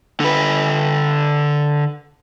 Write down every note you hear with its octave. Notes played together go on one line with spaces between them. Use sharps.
D3 B4